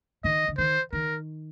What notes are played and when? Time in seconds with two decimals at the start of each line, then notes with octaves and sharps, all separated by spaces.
0.24 D#3 D#5
0.48 D3
0.58 D#3 C5
0.93 D#3 A#4